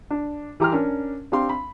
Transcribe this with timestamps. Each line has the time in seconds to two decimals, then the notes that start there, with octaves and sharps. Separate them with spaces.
0.11 D4
0.60 E3 G4 A#5 C6 F6
0.72 C#4 D4 A#4
1.32 C4 D4 G4 F5 C6
1.49 B5